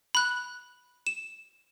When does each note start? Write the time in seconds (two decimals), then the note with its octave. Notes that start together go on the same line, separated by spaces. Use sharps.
0.15 B5 F#6
1.07 E7